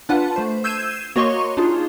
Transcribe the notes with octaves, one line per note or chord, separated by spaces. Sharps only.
D4 F4 B4 F#5 A5
A3 C5
E6 G6 G#6 C7 D#7 E7
A#3 F#4 C#5 D#5 C6 C#6
D4 D#4 F4 G#4